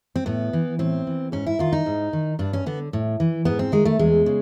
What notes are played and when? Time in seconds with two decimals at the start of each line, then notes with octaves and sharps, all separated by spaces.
0.16 C4
0.26 A2 B3
0.53 E3
0.79 A2 C4
1.07 E3
1.32 G#2 C#4
1.46 E4
1.59 D#3 F4
1.73 D#4
1.86 G#2
2.13 D#3
2.39 G2 D4
2.53 C#4
2.66 D3 B3
2.93 A2
3.20 E3
3.45 G#2 B3
3.59 C4
3.72 D#3 G#3
3.85 A3
3.99 E2 G#3
4.26 C#3